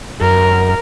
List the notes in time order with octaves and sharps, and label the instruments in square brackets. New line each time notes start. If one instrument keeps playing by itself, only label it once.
[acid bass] F#2 [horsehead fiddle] A#4